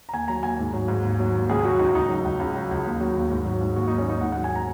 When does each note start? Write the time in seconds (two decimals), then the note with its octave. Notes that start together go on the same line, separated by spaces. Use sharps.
0.09 A#5
0.13 D#2 G#5
0.28 F#3 A#5
0.43 D#2 G#5
0.59 G#2
0.73 F#3
0.88 G#2
1.04 D#2
1.19 F#3
1.35 D#2
1.49 C#2 G#4
1.65 F#3 F#4
1.79 C#2 D#4
1.95 C#2 D#4
2.09 F#3
2.24 C#2
2.39 C#2
2.55 F#3
2.71 C#2
2.86 D#2
3.01 F#3
3.15 D#2
3.30 G#2
3.45 F#3
3.61 G#2
3.76 D#2 F#4
3.88 F#3 D#4
3.98 C#4
4.06 D#2 D#4
4.21 G#2 F#5
4.32 F#3 F#5
4.44 G#5
4.56 A#5